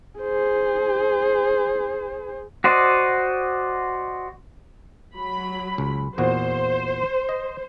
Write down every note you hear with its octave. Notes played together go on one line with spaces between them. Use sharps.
G#4 C5
F#4 C5 D5 D#5
F#3 B5
C#2
E2 A#2 F#4 C5
D#5